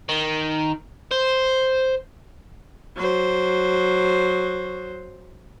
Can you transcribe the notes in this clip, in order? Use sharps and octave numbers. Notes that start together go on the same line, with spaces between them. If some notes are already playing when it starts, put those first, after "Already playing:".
D#3
C5
F#3 C5